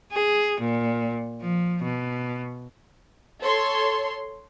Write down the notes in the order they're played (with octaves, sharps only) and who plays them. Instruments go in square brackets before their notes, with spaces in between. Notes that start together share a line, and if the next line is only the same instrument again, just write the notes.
[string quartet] G#4
A#2
F3
B2
[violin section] A4 C#5 C6